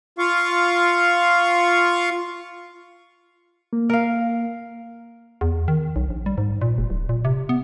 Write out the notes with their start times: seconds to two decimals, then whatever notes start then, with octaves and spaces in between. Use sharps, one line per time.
0.19 F4 F5 C#6
3.73 A#3
3.90 A#4 F5
5.41 E2
5.68 D#3
5.96 B1
6.10 A#1
6.26 G3
6.38 G#2
6.62 A#2
6.78 F1
6.90 D1
7.09 A#2
7.25 C3
7.49 B3